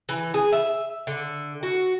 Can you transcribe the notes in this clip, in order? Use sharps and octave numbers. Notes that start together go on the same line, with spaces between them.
E3
G#4
E5
D3
F#4